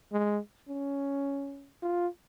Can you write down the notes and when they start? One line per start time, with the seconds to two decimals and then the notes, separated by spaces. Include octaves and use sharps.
0.13 G#3
0.69 C#4
1.83 F4